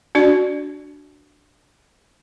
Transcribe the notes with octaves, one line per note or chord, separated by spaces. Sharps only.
D4 F#4 D5